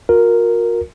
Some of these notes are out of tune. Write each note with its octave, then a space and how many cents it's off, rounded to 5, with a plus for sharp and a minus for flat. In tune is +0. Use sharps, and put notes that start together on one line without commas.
F#4 -45 A#4 +0